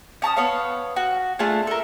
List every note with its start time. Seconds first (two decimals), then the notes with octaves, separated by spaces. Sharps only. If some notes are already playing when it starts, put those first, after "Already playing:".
0.22 C#4 A5 A#5 D#6
0.36 B3 C#5 F5
0.96 F#4
1.39 A3 D4 F4 G#4
1.67 A4 A#4